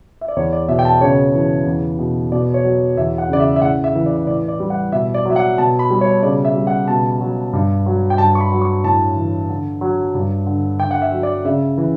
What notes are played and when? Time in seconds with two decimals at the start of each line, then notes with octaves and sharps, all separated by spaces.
0.21 E5
0.28 D5
0.36 E2 C#5
0.53 D5
0.68 B2 E5
0.79 G5
0.85 A5
1.01 C#3 C#5
1.35 E3
1.66 E2
1.99 B2
2.32 B2 D5
2.54 C#5
2.64 F#3
2.97 E2 E5
3.18 F#5
3.29 C#3 D5
3.40 E5
3.56 E5
3.62 A2 F#5
3.84 E5
3.95 E3
4.06 D5
4.27 A2 D5
4.49 D5
4.60 G3
4.70 F#5
4.92 B2 E5
5.14 D5
5.25 F#3 E5
5.36 F#5
5.58 B2 A5
5.79 B5
5.90 G3
6.01 C#5
6.22 C#3 D5
6.45 E5
6.55 G3
6.67 F#5
6.88 B2 A5
7.21 F#3
7.53 G2
7.86 F#3
8.10 G5
8.18 G2 A5
8.35 C#6
8.40 B5
8.52 F#3
8.62 C#6
8.84 A2 A5
9.16 E3
9.49 D3
9.81 F#3
10.14 G2
10.46 D3
10.80 D3 G5
10.91 F#5
11.02 E5
11.12 F#3
11.23 D5
11.44 C#3 E5
11.78 E3